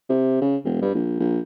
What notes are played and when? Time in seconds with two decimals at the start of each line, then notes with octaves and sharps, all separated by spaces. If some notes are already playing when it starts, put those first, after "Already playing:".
0.09 C3
0.42 C#3
0.64 E1
0.82 G2
0.95 A#1
1.20 A#1